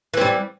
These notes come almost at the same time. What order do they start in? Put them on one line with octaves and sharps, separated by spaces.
E3 C4 G3